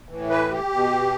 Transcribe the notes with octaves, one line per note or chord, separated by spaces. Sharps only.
A2 E3
B4
G4
B2